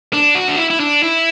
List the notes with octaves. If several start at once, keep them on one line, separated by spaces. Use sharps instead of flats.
D4
F#4
D4
E4
E4
D4
E4